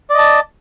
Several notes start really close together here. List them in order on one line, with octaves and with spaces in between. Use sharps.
D5 D#5 A5